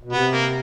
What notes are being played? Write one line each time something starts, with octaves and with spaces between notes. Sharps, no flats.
B2
C3 B3
A#3